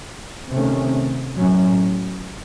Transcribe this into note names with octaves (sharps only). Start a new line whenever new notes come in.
C3 D#3 A3 C#4
A2 F#3 C#4